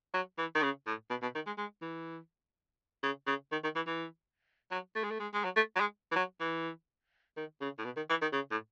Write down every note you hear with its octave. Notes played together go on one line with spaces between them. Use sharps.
F#3
E3
D#3
C#3
A2
B2
B2
D#3
G#3
G#3
E3
C#3
C#3
D#3
D#3
E3
E3
F#3
A3
G#3
A3
G#3
G#3
F#3
A3
F#3
G#3
E3
F#3
E3
D#3
C#3
A2
B2
D#3
E3
D#3
C#3
A2